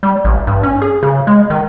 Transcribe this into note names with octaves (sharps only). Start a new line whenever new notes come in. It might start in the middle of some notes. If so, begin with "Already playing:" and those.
G3
A1
G2
C#4
G#4
C#3
G#3
D#3